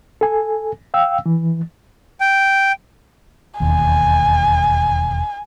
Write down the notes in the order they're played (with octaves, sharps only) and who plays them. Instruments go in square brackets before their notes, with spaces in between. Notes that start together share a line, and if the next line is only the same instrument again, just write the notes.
[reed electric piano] A4 G#5
F5 G5 E6
E3
[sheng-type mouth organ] G5
[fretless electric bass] E1 D#2 [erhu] G#5